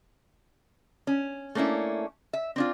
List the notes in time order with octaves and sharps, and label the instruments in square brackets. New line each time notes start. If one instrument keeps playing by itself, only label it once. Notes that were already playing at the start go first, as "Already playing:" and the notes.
[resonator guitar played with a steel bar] C#4
A3 A#3 C#4 D4 E4
E5
C4 D4 F4